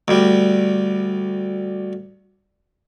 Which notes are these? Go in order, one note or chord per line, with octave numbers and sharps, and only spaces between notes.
D2 G3